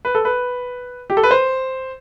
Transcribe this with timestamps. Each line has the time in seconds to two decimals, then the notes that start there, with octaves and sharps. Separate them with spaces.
0.05 B4
0.15 A4
0.25 B4
1.10 G4
1.17 A4
1.23 B4
1.31 C5